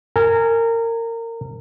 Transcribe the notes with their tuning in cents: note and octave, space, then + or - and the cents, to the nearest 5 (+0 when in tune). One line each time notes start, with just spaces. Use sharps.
A#4 -25 G#5 +0